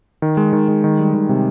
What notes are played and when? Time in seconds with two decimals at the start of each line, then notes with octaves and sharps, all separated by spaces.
0.22 D#3
0.37 G#3
0.53 D#3
0.68 G#3
0.84 D#3
0.99 G3
1.14 D#3
1.29 C3